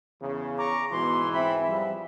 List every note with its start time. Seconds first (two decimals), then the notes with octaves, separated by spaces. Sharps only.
0.21 E2 C#3
0.59 A#5 C#6 D6
0.91 G#2 B2 E3 C6
1.34 C4 E5 B5
1.67 F3 G3